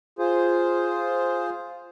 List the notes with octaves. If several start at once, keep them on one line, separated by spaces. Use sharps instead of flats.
F4 G#4 C5